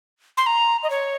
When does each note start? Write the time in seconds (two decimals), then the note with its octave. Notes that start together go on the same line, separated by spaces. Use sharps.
0.37 C6
0.46 A#5
0.83 D#5
0.90 C#5